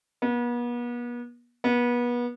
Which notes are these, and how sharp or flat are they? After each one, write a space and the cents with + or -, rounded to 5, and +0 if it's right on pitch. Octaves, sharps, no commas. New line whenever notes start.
B3 -40
B3 -30